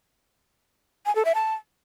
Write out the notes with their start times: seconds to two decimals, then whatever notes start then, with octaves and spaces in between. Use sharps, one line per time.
1.06 G#5
1.15 A4
1.25 E5
1.35 A5